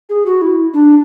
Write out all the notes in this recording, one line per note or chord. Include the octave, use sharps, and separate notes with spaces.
G#4
F#4
E4
D4